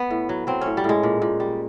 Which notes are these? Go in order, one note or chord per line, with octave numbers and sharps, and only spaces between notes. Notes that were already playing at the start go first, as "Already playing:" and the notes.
Already playing: B3
A2
F#3
F#3 C4
A2 C#4
G3
A2 G#3
A#2
A#2
G3